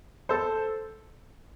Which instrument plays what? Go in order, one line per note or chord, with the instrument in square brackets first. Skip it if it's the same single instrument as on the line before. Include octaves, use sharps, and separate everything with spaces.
[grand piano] A4 C5